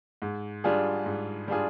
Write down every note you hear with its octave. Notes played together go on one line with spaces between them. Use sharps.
G#2
G3 D4 F4 G#4
G#2
G3 D4 F4 G#4